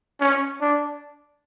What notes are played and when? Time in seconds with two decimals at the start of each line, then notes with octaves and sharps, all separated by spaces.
0.21 C#4
0.61 D4